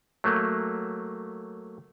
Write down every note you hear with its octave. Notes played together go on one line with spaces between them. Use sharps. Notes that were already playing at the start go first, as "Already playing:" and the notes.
F#3 A3 A#3